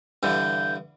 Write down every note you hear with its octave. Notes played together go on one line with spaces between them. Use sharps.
G2 D3 E3 G6